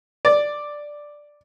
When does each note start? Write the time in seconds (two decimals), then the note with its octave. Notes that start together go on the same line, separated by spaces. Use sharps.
0.25 D5